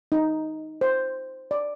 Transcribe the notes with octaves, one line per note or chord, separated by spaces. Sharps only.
D#4
C5
D5